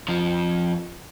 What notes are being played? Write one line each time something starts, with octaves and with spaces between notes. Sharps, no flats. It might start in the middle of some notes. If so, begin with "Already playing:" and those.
F2 F3